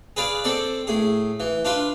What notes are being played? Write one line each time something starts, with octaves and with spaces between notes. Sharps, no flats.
G#4 B4 D5 F5
C4 A4 D5
A2 G#4
E3
D4 F4 B4